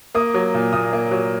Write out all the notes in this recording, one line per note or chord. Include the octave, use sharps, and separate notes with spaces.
A#3 D#6
F#3
A#2
A#2 D#6
A#3
F#3